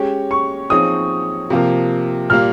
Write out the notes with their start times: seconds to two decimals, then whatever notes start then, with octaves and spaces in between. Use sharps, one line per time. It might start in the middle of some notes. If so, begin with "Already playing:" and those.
Already playing: G#3 C#4 G4 C#5
0.31 C#6
0.70 F3 C4 D#4 G#4 C#5 D#6
1.50 C3 F3 A#3 F4 A#4
2.30 A#2 G3 A#3 F6